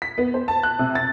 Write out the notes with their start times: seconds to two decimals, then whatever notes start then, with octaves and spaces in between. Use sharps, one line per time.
0.02 B6
0.18 B3
0.34 C5
0.48 A5
0.63 F#6
0.79 C3
0.95 A6